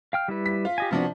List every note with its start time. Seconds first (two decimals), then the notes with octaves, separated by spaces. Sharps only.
0.13 F5 G5 F6
0.28 G3 E4 B4
0.46 B6
0.65 F4
0.78 G4 D#5 G#5
0.91 C3 F3 B3 D4 F#4